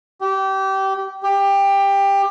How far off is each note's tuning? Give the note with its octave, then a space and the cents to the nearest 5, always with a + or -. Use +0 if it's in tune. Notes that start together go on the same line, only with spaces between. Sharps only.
G4 -25
G4 +15